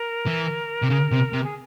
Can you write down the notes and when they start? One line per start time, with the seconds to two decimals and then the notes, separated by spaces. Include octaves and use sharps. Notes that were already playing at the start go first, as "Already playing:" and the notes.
Already playing: A#4
0.26 E3
0.82 C3
0.90 C#3
1.12 C3
1.33 C3
1.43 G#4